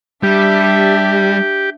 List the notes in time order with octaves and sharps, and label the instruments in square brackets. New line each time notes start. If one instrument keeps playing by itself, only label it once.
[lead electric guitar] G3 [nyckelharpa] D4 E5 [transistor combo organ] G4